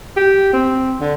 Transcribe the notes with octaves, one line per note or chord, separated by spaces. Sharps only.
G4
C4
D3